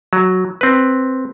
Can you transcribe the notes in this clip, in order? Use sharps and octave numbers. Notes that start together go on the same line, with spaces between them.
F#3
C4 B4